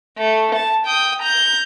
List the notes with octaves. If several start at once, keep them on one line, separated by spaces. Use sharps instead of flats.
A3
A5
G5 D#6
A#5 G6